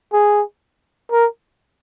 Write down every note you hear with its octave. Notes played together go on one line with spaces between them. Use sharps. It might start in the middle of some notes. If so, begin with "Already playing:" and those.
G#4
A#4